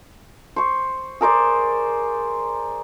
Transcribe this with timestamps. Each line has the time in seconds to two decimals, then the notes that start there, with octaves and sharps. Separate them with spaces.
0.56 C5 C#6
1.21 G#4 A#4 C5 D5